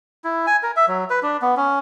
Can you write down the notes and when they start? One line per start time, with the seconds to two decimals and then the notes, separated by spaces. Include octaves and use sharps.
0.24 E4
0.47 G#5
0.63 A#4
0.76 E5
0.88 F#3
1.10 B4
1.23 D4
1.42 B3
1.57 C#4